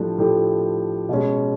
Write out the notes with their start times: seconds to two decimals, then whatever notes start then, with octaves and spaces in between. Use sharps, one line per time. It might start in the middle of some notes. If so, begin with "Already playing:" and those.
Already playing: A2 F3 A3 D4 G4
0.18 A2 F3 A3 D4 G4
1.09 B2 G#3 C#4